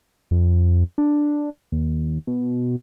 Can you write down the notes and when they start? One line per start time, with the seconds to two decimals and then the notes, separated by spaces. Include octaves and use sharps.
0.31 F2
0.98 D4
1.72 D#2
2.27 B2